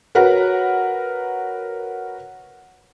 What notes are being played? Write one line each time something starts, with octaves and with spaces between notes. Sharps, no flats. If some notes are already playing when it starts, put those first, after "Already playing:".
F#4 A#4 B4 C#5 F#5